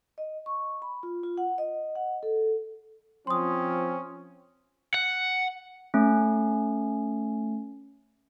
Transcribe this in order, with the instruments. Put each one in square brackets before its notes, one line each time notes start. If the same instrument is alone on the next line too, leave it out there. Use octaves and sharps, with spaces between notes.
[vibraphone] D#5
C#6
B5
F4
F4
F#5
D#5
F#5
A4
[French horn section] F3 F4 [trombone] C4 [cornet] C#4 [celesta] C6 D#6
[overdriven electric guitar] F#5
[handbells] A3 C#4